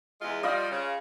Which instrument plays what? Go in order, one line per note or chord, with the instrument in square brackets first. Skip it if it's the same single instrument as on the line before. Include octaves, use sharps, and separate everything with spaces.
[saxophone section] E2 G#3 F4
[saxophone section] F3 G3 [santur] F4 D#5
[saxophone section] C#3